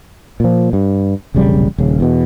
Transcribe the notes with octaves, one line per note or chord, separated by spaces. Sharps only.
A#2 F3
G2
E1 A#1 C#3 G3
D#1 C#3
E2 B2